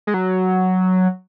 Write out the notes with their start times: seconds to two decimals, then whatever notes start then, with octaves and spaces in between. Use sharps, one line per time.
0.07 G#3
0.14 F#3